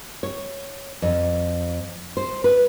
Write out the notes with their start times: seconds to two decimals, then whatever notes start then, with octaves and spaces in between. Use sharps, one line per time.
0.23 C#5
1.02 F2
2.17 C5
2.44 B4